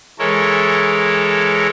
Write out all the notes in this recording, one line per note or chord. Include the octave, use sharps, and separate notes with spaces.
E3 G#3 A4 A#4 C#5